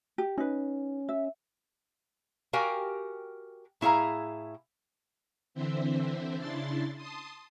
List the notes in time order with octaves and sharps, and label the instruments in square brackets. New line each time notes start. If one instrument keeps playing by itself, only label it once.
[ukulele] G4
[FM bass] C#4 [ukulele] D#4 B4
[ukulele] E5
[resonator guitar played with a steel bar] F#4 G4 A#4 F5 G5 G#5
A2 E4 G#4 F5 A#5
[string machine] D3 E3 C4 C5 E5
C#3 D4 E4 C6 A6
A5 C6 D#6